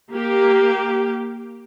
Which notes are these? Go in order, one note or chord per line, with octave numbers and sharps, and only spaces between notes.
A#3 G4